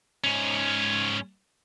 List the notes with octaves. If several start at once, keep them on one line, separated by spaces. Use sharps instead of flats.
G#2 C#4